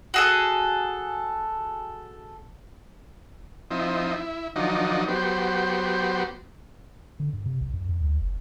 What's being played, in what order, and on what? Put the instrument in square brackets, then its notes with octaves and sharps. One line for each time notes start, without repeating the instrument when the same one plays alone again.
[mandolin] F#4 G#4 A4
[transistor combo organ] F3 C4 D#4 E4
E4
D#3 F3 F#3 D4 D#4
F#3 B3 G4 C5
[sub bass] D3
G2
C3
B1
F#2
F2
D2
F#1